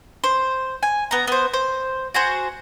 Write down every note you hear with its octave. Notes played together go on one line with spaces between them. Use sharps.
C5
G#5
B3 A#5
B3 C5
C5
F#4 G#4 C5